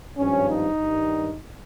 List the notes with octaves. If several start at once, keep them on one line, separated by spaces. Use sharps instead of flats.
G#1 G2 F3 C#4
D#4
G2 D#3 G3